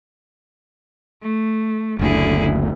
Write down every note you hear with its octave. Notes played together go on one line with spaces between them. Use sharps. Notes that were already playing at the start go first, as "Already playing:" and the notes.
A3
F#1 D2 D3 E4 G#4